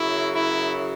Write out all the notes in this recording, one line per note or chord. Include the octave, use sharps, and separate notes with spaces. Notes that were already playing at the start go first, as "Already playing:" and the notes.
Already playing: F#2 C#3 F#3 E4
E4